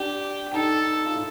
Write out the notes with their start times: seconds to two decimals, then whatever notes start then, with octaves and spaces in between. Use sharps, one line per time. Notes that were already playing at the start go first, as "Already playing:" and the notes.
Already playing: D4 G4
0.53 D#4 A4
1.05 F4
1.16 E4